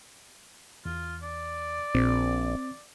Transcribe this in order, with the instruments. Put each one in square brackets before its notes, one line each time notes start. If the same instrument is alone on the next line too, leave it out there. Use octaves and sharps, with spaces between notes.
[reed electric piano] E2 [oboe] F4
[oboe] D5
[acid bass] A#1 [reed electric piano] C4